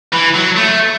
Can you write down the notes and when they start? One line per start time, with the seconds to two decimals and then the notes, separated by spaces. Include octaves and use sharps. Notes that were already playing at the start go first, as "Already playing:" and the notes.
0.12 E3
0.34 F#3
0.56 A3